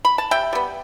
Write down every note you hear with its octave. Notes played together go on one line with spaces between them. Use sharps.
B5
A5
C3 E5 G5
G3 B3